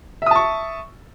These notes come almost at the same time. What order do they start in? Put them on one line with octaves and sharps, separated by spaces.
E5 D#6 A5 C#6